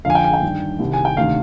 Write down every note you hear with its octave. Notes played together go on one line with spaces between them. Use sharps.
F2 D3 F5 G#5
G5
G#5
G5
G2 D#3
C2 C3 D#3
G#5
G5
D2 C3 D#3 F5